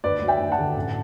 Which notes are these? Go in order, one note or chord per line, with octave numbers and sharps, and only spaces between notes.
D2 B4 D5
F#3
E5 G5
D2
F#5 A5
D3
A1